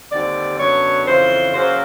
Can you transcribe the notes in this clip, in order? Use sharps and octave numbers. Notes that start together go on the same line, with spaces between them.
D#2 D3 G3 C4 D5
F#2 D3 F#3 B3 D4 C#5
F2 C#3 E3 C5
C#3 F#3 A#3 C#4 C5